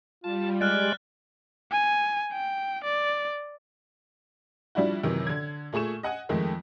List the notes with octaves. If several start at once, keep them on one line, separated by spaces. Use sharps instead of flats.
G3 F4 A5
G#3 D5 F6 F#6 A6
G#5
G5
D5
F3 G3 D4 E4 F#4
F#2 C3 D#3 E3
D3 G#6
A#2 A3 G#4 C#6 E7
D#5 F#5 G#5
F2 D#3 G#3 A3